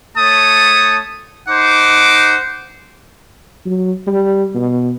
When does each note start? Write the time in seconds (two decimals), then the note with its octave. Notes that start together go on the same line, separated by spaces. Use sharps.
0.17 A3 C#5 A5 D#6
1.49 D#4 C5 F#5 D6
3.66 F#3
4.07 G3
4.55 B2